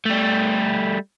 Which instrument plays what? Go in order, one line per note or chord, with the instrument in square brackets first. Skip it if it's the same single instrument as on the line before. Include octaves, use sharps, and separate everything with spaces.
[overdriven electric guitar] G3 A3